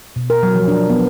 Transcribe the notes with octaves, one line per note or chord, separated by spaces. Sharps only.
B2
A#4
F#3
F3
D4
B3